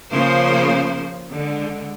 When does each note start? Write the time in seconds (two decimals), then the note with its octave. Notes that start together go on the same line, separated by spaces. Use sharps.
0.13 C#3 F3 A#3 C5
1.32 D3 G#3